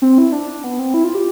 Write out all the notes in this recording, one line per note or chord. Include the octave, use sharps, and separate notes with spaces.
C4
E4
D4
B3
C4
E4
F4
G4